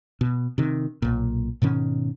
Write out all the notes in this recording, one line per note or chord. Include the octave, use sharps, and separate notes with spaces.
B2
C3 D#3
B1 A#2
G#2 B2 D#3 C#4